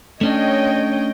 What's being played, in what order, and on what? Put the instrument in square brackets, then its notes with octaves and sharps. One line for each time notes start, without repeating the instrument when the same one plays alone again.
[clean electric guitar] A3 C#4 D4 [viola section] C#5 D#5 G5